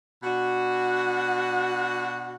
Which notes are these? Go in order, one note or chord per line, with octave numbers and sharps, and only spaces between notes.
B2 D4 F#4